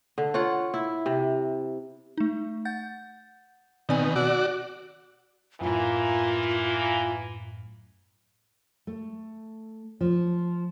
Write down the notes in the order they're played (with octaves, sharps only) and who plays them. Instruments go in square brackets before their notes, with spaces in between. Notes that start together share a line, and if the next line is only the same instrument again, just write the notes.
[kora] D3
F4 C#5 F#5
E4
C3
[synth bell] A3 D#4
F#5 G6 A6
[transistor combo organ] B2 D#3 [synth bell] C4 D5 G#5
[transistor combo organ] F#4 D5 [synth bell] E6 F#7
[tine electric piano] F#2 A2 [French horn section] E3 A#3 [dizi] F4
[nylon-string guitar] A3
F3